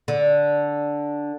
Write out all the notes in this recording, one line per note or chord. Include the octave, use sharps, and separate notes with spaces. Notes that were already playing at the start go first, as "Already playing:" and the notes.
D3